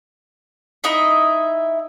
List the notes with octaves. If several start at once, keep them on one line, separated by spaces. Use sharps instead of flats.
D#4 E4 D#5 E5